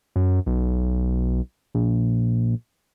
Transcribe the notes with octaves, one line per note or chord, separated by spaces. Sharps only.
F#2
B1
A#1